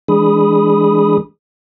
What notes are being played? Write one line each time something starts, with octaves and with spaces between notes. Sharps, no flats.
E3 G#3 D4 G#4 B5 D#6